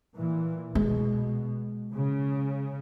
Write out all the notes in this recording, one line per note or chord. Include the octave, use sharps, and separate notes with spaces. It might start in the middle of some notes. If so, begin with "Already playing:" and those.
A#2 E3
B2 G#3
C#3